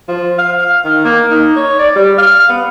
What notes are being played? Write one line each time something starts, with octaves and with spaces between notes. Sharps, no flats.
F3
F5
F5
D#3
A#3
D#4
C#5
D5
G3
F5
B3